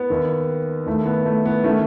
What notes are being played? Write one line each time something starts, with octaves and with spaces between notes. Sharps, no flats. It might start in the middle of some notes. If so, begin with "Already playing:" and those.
Already playing: B3
D#2 D#3
D#2 D#3 A3
B3
A3
B3
D#3 A3 C#4